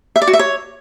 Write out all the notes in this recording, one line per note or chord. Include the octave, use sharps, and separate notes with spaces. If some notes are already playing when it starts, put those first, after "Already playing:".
E5
D5
F#4
E5
C#5